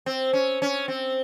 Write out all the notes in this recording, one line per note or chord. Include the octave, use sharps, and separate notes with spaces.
C4
C#4
C#4
C4